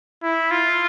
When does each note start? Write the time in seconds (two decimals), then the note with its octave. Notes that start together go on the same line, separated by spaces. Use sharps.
0.23 E4
0.51 F4